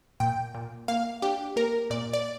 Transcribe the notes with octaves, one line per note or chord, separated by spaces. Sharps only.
A#2 G5
A#2
A#3 F5
D4 G4
A#3 A#4
A#2 D5
D5